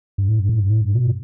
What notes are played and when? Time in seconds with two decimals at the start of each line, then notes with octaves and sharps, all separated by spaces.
0.18 G2
0.29 A2
0.39 G2
0.49 A2
0.59 G2
0.70 A2
0.81 G2
0.95 B2